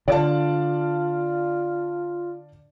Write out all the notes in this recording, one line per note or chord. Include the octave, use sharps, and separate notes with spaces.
D3 F4 D5 F5 A5